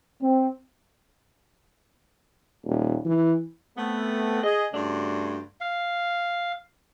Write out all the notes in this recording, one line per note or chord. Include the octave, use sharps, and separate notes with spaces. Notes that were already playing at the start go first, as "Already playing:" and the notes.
C4
D#1
E3
A3 B3 C4
G#4 D#5
G2 C#3 A3 D4 F#4 C6
F5